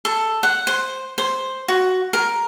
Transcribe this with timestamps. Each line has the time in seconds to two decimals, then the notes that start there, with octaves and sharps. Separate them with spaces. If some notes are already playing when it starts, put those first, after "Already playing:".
0.05 A4
0.43 F#5
0.67 C5
1.18 C5
1.68 F#4
2.13 A#4